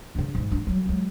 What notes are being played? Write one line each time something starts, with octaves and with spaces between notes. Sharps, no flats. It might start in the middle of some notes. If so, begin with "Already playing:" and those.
C#3 D4
G#2
D4
F#3 G3
F#3 G#3